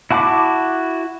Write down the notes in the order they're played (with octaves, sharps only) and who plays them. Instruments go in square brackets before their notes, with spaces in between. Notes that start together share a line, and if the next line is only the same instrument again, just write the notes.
[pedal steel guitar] E4 F#4 A5 B5 D6